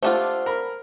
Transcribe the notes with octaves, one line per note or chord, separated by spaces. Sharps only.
A3 D4 F4 G4 C5 F#5 A5
A#4 B5